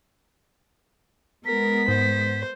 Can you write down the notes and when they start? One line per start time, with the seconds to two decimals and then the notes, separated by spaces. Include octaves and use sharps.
1.46 G#3 B3 A#4 B6
1.88 G#2 C5